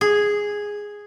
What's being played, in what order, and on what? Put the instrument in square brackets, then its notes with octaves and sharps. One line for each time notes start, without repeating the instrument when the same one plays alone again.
[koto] G#4